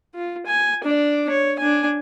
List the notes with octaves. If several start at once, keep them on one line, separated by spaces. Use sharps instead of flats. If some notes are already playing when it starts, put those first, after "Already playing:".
F4
G#5
D4 D5
C#5
D4 G#5